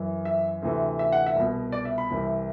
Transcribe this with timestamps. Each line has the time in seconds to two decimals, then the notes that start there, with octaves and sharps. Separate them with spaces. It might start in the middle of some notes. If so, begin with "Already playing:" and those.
Already playing: F#2 E3
0.25 E5
0.62 D2 C3 E3
0.99 E5
1.12 F#5
1.26 E5
1.36 C2 B2
1.72 D5
1.85 E5
1.98 B5
2.10 C2 C3 E3